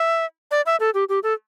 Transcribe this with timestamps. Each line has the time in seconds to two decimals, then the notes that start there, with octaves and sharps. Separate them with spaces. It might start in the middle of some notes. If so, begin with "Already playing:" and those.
Already playing: E5
0.51 D5
0.66 E5
0.80 A4
0.94 G4
1.09 G4
1.23 A4